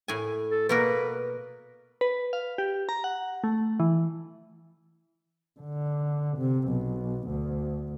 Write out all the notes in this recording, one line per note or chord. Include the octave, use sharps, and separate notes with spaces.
A2 G#5
A4
B2 A#3 A#4 B4
B4
F5
G4
A#5
F#5
A3
E3
D3
C3
B1
D2